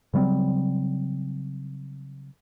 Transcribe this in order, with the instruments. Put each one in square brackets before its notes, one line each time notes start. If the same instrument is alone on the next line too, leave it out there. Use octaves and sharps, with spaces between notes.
[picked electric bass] C#3 F#3 G3 C4